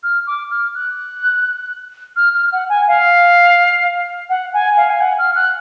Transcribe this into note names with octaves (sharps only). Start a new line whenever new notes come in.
F6
D6
F6
F#6
F6
F6
F#5
G#5
F5
F#5
G#5
F5
G#5
F#5
F6
F#6